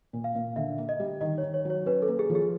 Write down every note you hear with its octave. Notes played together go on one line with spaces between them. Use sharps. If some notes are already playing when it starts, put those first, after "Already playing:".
A#2
F5
A#2
D3 E5
A#3
D#5
G3
D#3 D#5
C#5
D#3
C#5
F#3
C#5
C#4 B4
A4
A#3
G#4
F3
G#4